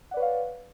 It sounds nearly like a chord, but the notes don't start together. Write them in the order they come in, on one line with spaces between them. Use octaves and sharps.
F#5 D5 B4 C#5 F5